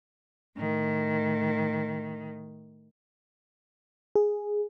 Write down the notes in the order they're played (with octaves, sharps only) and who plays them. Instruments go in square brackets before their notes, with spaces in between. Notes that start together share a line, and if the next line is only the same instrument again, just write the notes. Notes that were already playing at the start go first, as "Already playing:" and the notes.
[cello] A2 D#3
[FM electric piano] G#4